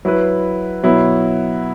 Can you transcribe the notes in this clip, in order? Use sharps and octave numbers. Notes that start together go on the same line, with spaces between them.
F#3 E4 B4
B2 F#3 B3 E4